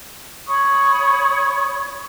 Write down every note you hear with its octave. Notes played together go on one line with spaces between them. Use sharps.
C#5 B5 C#6 D#6